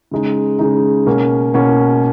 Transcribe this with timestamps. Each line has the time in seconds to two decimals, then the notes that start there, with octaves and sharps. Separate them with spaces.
0.11 C#3 G#3 D#4
0.59 C#3 G#3 D#4
1.06 B2 A#3 C#4
1.54 B2 A#3 C#4